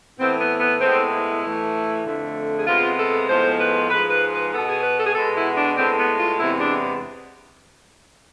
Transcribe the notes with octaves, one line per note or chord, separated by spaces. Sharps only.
A2 E3 B3 C4
B3
B3
A2 G#3 B3 C4
E4
A2 E3 A3
F2 D3 A3
G#4
C3 G#3 B3 F4
A4
A2 F3 G#3 B3 C5
B4
G#2 F3 G#3 B4
B4
B4
B2 B3 A4
G#4
B4
A4
G#4
B2 G#3 B3 A4
E4
D4
A2 G#3 B3 C4
B3
F4
E2 C3 G#3 B3 E4
D4